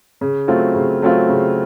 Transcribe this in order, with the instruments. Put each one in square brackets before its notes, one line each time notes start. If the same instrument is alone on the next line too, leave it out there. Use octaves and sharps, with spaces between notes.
[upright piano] C#3
F#3 A3 C4 F4
C#3
F#3 A3 C4 F4
C#3